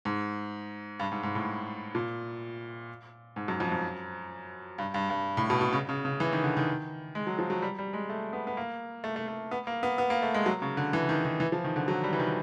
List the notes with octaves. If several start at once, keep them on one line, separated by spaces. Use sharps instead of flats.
G#2
G2
G#2
G#2
A2
A#2
G#2
F#2
F2
F#2
G2
G2
G2
A2
B2
B2
C#3
C#3
C#3
E3
D#3
D3
D#3
G#3
F#3
F3
F#3
G3
G3
G#3
A3
B3
B3
A#3
A3
A3
A3
B3
A#3
B3
B3
A#3
A3
G#3
F#3
C#3
D3
E3
D#3
D#3
E3
F3
D#3
D3
F#3
G3
E3
D#3